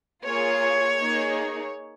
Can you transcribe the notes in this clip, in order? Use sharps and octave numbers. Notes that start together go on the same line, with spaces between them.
A#3 F4 G#4 C#5
A#3 D#4 G#4